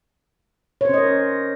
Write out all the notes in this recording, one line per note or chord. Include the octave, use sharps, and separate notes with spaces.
C#4 A#4 C5 C#5 D#5